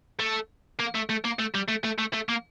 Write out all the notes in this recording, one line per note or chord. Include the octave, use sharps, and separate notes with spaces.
A3
A#3
A3
A3
A#3
A3
G3
A3
A3
A3
A3
A#3